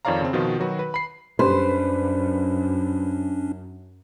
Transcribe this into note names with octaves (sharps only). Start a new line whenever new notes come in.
F2 D#3 C#5 D5 F5 A#5
C#3 C4
B2 D#3 F3 F4 F#4
D#3 F#3 F#4 B4
B4
B5 C7
F#2 G3 C#4 D4 B4 C5